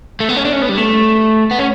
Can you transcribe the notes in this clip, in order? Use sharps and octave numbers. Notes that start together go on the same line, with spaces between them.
A3
B3
C#4
D4
C#4
B3
G3
A3
B3
C#4